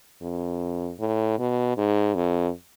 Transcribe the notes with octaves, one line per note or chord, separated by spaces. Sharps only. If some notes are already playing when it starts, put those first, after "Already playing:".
F2
A2
B2
G#2
F2